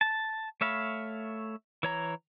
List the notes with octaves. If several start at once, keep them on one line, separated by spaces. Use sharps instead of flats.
A5
A3 C#5 E5 F5 B5
E3 C#5 A#5